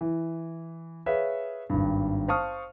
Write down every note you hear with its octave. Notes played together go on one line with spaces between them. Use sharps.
E3
G#4 B4 C#5 E5 F5
G#1 G2
C5 F5 A5 C#6 D#6 F6